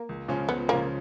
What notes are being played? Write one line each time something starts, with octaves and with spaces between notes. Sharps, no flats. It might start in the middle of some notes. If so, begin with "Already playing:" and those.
Already playing: A#3
C#2
C#3 F3 G#3 C#4
C#2 B3
C#3 F3 G#3 A#3 C#4